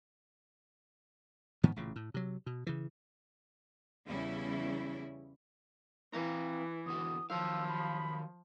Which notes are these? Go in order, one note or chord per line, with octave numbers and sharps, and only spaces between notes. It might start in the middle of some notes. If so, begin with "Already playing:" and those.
G#2 D#3 F3 B3
A1 A#2 C#3
A2
C3 F#3
B2
C#3 E3
E2 C#3 G3 C#4 E4
E3 C4 F5 A#5
E2 D3 F#4 D#6
D#3 F3 F#3 F5 E6
B5